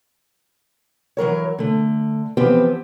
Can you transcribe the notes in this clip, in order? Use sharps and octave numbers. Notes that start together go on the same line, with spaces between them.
E3 F#3 A#4 C#5
D3 A3
E3 F3 B3 C4 G4 B4